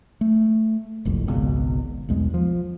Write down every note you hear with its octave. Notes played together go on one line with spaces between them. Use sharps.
A3
F#1 C2 F2
G#1 C#2 B2
B1 E2 G#3
F3